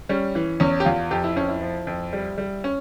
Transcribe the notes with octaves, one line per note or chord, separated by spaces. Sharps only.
G3 C#4
E3
E2 C#4
G4
E2 F4
F2 G4
E4
F2 C#4
E4
F3
F2
G3
G3
C#4